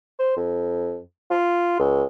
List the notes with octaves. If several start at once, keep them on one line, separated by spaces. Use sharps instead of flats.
C5
F2
F4
C#2